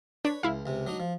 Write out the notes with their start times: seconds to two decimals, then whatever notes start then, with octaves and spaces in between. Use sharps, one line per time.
0.25 D4 B4 C#5
0.43 C#2 E4 F5
0.66 C#2 C3
0.87 F#3 D4 D#4
1.00 F3